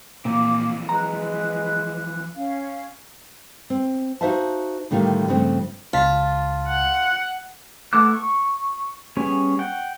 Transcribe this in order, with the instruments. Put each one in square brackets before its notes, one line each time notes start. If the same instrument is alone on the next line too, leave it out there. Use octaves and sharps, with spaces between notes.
[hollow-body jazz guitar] A#2 [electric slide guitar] E3 F3 C4 [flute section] F5 D6
[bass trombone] G#3 [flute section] B4 F#6 [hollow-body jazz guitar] A#5
[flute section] C#4 F5
[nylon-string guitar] C4
D#4 F#4 C5 E5 F5 A5
A2 D3 D#3 G3 F4
G2 C#3 F3 A3 C4
[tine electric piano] C#2 A5 B6 [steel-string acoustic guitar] F4
[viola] F#5
[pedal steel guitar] A3 B3 E4 D6 F#6
C#6
G3 B3 C#4 G#4
F#5 G5